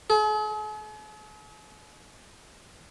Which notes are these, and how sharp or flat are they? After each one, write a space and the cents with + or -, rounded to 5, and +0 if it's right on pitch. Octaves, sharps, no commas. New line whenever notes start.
G#4 +45